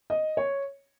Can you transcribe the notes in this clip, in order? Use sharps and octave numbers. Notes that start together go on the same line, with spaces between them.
D#5
C#5